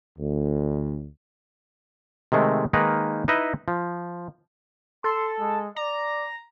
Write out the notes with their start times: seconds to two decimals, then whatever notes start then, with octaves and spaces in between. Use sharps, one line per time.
0.19 D2
2.32 C3 D#3 G#3 A3
2.73 D#3 G#3 A#3 D#4 A#4 B4
3.28 D#4 E4 B4 D#5 E5
3.68 F3
5.04 A4 C6
5.40 G#3
5.76 D5 A#5